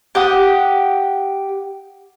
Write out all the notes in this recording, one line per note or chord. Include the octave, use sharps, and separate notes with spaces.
G4 F#5 D#6